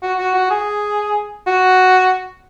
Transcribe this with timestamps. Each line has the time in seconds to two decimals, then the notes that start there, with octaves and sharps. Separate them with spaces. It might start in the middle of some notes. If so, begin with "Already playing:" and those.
0.03 F#4
0.19 F#4
0.35 F#4
0.51 G#4
1.47 F#4